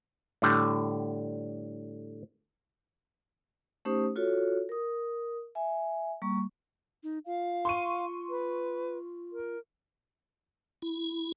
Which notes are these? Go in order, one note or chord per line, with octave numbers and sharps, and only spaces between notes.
A2 D3 G3
A3 C#4 D#4 G4 C5 D#6
F4 F#4 A4 C#5
A#4 D#6
E5 G#5
G3 A#3 C#6
D#4
F4 F5
C6 C#6 D#7
B4
A#4
E4